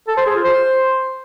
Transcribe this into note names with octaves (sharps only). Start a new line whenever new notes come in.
A4
C5
G#4
F4
C5